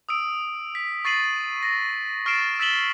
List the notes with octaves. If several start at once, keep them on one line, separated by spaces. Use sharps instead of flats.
D#6 E6 D7
B6
C#6 A6 C7 D#7 F#7
A#6
C#6 F6 A6 C7 D7 E7
E6 A6 B6 E7 F#7 G7